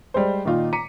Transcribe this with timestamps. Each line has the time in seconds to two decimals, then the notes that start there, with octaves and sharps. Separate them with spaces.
0.14 G3 G#3 C5
0.45 A#2 D#3 D#4 F4
0.73 A#5 D6 B6 C#7 D#7